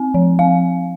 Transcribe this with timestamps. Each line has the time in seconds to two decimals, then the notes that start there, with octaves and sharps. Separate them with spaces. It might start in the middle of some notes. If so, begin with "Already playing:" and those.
Already playing: C4
0.14 F3
0.39 C4 F5